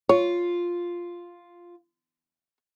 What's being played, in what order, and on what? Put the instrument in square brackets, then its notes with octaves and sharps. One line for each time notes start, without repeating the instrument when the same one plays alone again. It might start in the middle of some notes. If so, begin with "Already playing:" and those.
[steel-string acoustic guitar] F4 [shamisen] C#5